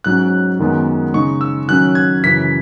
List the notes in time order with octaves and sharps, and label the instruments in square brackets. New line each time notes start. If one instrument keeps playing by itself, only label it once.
[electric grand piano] G#2 F#3 C#4 F#6
F#2 D#3 G#3 B3
C#3 G#3 D#4 C#6
E6
D#3 F#3 C#4 F#6
G#6
F#2 C#3 E3 B6